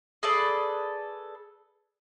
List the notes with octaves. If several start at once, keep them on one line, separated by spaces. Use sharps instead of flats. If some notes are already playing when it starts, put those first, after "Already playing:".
G#4 A4 B4 D5